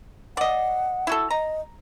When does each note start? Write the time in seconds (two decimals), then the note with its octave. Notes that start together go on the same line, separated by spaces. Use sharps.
0.37 D5 D#5 F#5
1.07 E4 F#4 A4
1.30 D#5 A#5